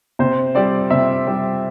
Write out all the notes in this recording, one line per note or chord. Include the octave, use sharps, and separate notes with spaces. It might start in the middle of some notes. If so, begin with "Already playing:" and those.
C3 C5
G3 C4 D5
C3 E5
G3 C4